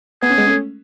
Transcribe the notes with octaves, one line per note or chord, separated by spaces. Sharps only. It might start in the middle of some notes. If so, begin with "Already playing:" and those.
B3 G#4
C#4
G#3 B3
A3 C#4